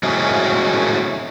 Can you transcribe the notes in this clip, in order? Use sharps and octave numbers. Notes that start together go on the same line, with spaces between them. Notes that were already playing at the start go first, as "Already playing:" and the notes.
G#3 A3 C#4 E4 F#4 G#4